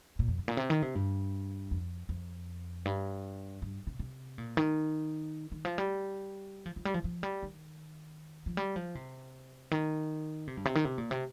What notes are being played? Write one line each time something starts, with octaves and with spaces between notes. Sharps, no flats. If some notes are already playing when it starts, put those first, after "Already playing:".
A#2
F2
G2
A#2
C3
D#3
C3
G2
F2
F2
G2
G2
C3
C3
A#2
D#3
D#3
F3
G3
F3
F3
G3
F3
F3
G3
D#3
F3
G3
F3
C3
D#3
C3
G2
C3
D#3
C3
A#2
C3